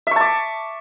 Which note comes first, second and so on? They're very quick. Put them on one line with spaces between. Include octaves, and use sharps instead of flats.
E5 C#6 A5 D6